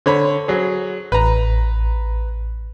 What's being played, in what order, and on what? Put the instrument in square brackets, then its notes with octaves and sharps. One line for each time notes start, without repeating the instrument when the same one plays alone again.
[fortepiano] D3 C#5 B5 [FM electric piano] C5
[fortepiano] F#3 G#4
[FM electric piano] A1 [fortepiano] B4 A#5